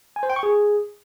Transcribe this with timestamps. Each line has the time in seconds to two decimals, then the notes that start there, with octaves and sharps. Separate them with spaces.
0.16 G#5
0.23 C5
0.30 G5
0.36 C#6
0.43 G#4